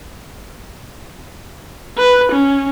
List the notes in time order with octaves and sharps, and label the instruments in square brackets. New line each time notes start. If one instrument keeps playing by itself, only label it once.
[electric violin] B4
C#4